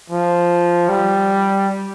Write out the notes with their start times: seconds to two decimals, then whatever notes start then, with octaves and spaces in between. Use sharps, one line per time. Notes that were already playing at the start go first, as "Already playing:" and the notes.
0.10 F3
0.89 G3